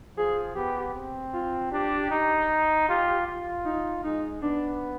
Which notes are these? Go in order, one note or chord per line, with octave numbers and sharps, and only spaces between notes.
F3 G#4
B3 G4
C4
F4
D4 G4
D#4
F4 G4
F4
D#4
G#3 D#4
B3 D4